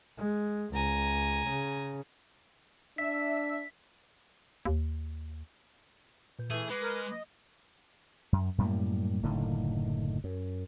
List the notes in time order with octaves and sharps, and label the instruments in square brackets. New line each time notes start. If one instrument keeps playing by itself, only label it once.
[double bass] G#3
[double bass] C#2 [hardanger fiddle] G#5 A#5
[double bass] C#3
[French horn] D4 [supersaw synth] E5 [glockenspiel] B6
[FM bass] D#2
[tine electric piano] A#2 B4 G6
[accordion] E3 [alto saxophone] A3 [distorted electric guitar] G#4
[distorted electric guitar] G#3 [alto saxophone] B4 [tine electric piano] B5 D6 G#6
[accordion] A#4
D#5
[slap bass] F#2
F#2 A2 G3 A#3
F#1 A2 D3 D#3
F#2